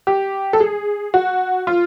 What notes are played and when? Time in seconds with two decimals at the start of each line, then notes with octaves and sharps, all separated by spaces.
0.07 G4
0.53 A4
0.60 G#4
1.14 F#4
1.67 F4